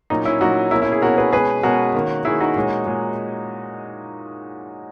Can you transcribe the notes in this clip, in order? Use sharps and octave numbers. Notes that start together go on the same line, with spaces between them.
A#2 F#3 C#4 D#4
C#4 E4
A#2 F#3 C#4 D#4 F#4
B2 A#3 C#4 E4
C#4 E4
E4 G#4
B2 A#3 C#4 F#4 A#4
G#4 B4
B2 G#3 C#4 G#4 B4
B2 G#3 C#4 F#4 A#4
D#3 A#3 C#4
D#3 A#3 C#4 E4 G#4
D#4 F#4
A#2 G#3 C#4
A#2 G#3 C#4